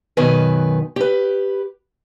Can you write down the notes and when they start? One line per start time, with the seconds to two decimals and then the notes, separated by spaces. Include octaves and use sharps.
0.17 F#2 B2 D#3 B4 G#5
0.96 G4 B4